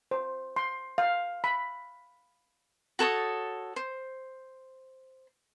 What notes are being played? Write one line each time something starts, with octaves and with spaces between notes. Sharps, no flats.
C5
C6
F5
B5
F#4 A4 C#5 D#6
C5